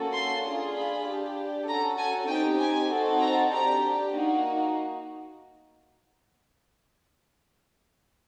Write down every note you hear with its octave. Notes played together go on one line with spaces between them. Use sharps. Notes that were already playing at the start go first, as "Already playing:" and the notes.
Already playing: A#3 C#4 F#4 A4
C6
D4 F4 G#4
B5
D4 G4
C#4 F#4 A4 A#5
G#5
C4 D#4 G4 G5
G#5
C4 D#4 F#4 A4
A#5
D4 G4 A#5
A#3 D#4 F#4